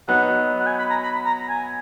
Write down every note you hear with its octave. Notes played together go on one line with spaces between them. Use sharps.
F#3 B3 D#4 F#5
F#5
G#5
B5
A#5
B5
A#5
G#5